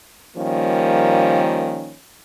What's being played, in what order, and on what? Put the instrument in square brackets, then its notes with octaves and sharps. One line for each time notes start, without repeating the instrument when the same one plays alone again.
[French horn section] D#3 F3 G3 A#3 C#4